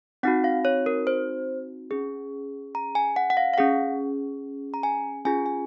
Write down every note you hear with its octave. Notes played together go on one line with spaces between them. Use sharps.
C4 D#4 F#4 F#5
F5
C#5
A#4
C5
C#4 G#4
A#5
G#5
F#5
F#5
F5
F5
C#4 G#4 F#5
A#5
G#5
C#4 F4 G#4 G#5
G#5